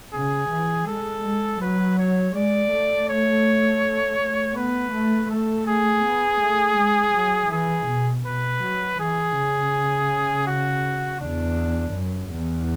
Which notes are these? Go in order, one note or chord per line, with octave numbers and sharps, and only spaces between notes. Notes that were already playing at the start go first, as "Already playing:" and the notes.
C#3 G#4
E3
G#3 A4
G#3
F#3 B4
C#5
G#3 D5
A3
C#5
B3 B4
A3
A3 A4
G#4
B3
A3
G#3
F#3
E3 G#4
B2
B2 B4
F#3
E3 G#4
C#3
F#4
E2 D4
F#2
E2